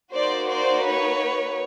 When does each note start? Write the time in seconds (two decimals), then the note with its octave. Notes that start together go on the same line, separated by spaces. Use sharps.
0.14 A#3 D#4 F#4 C5 D5
0.50 C5 D5
0.85 B4 C#5